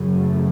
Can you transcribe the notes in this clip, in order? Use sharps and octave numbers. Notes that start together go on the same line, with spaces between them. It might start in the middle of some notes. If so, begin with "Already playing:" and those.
Already playing: F#2 C#3
A3